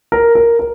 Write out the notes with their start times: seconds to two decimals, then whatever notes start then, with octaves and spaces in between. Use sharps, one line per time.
0.12 A#4
0.35 A#4
0.59 A#4